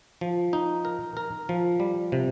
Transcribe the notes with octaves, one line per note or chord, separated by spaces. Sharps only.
F3
D#4
A#4
A#4
F3
G3
C3